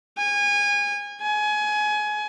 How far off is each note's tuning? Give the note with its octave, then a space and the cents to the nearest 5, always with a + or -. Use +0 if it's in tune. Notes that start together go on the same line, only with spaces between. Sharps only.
G#5 -25
G#5 +25